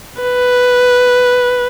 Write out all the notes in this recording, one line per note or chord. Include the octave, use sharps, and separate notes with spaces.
B4